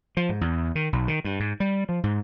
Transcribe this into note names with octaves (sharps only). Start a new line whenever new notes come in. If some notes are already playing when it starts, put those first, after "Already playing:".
F3
G#2
E2
D#3
B1
D#3
G2
G#2
G3
F3
G#2